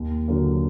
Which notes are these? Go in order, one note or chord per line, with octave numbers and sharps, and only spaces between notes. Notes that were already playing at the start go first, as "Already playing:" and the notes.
Already playing: D#2
D3 F#3 A#3